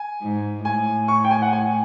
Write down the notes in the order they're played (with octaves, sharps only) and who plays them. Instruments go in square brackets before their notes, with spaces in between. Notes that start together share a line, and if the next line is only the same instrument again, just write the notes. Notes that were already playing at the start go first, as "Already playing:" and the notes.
Already playing: [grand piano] G#5
[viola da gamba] G#2
[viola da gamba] A2 [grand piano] G#5
[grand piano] C#6
G5
G#5
F#5
G#5